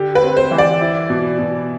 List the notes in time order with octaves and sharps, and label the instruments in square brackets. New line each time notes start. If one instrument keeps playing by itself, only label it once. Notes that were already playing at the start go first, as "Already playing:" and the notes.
Already playing: [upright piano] D3 G4
[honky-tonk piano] B4
[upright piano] C4
[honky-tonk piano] C5
[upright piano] E3
[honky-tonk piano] D5
[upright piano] E4
B2
B2